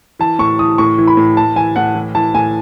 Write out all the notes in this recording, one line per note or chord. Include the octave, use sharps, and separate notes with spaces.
E3 A5
A2 C#6
E3 D#6
A2 C#6
E3
B5
A2
E3 A5
E3 G#5
A2 F#5
E3
E3 A5
A2 G#5